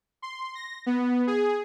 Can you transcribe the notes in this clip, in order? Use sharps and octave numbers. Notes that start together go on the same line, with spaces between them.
C6
A#6
B3
G#4